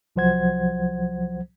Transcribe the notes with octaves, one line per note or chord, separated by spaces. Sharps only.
C2 F3 F#3 C5 F#5 G#6